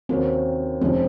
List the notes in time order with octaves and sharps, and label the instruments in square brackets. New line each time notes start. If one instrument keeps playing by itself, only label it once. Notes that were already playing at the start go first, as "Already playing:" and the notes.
[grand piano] D#2 D#3 A#3 C#4 F#4 [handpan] C4
[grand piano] F1 F2 C#3 G#3 [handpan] C4